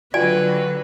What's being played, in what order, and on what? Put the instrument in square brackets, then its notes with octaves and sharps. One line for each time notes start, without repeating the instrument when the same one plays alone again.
[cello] D3 F#3 [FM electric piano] F4 F#4 G5 [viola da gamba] B4 [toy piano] D5 G#5